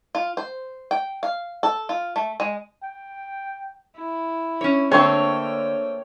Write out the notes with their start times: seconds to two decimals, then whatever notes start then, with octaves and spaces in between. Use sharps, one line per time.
0.15 F4
0.37 C5
0.91 G5
1.23 F5
1.63 A4
1.89 F4
2.16 A3
2.40 G#3
2.83 G5
3.96 E4
4.61 C#4 C#5
4.92 D3 A3 A#3 C4 C#5 G5